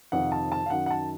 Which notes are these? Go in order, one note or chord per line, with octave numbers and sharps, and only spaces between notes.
F2 C3 D#3 F#5
A5
A5
F5
F#2 D#3 F#5
F#5
A5